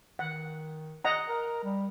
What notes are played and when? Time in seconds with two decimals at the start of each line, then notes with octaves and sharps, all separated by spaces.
0.19 D#3 F#5
1.04 D#5 F#5 A#5
1.29 A#4
1.64 G3